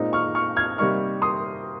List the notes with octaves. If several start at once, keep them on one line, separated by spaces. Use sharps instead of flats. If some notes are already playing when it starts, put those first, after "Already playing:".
Already playing: A#2 G#3 C4 D#4
C#6 F6
C#6 F6
F6 G#6
C3 G3 A#3 D#4 C#6 F6
C6 D#6